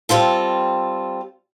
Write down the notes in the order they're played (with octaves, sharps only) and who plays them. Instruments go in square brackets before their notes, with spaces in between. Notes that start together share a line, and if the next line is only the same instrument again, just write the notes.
[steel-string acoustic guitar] G3 C4 F4 A4